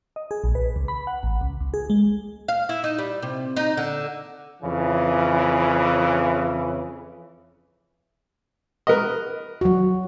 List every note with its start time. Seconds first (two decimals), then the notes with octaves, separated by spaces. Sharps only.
0.16 D#5
0.31 G#4
0.44 A#1
0.55 B4
0.76 C#2
0.88 B5
1.07 F#5
1.23 A1
1.41 C#2
1.61 C#2
1.74 G#4
1.90 G#3
2.48 F5
2.69 E4
2.84 D#4
2.99 G3
3.22 C3
3.56 D#4
3.77 D3
4.63 F2 C#3 E3
8.87 A#4 B4 D#5
9.61 F#3 F#4